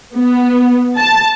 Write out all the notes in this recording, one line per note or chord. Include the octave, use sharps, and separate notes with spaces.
B3
A5